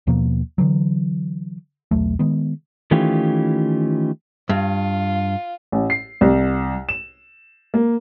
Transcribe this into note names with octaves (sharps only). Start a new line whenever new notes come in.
D#2 B2 F3 A#3
D3 E3 F#3
B1 E2 F#3 A3
D#3 G#3 B3
D#3 E3 A3 C#4 F4 G4
G2 F4
A1
C7
C2
E7
A#3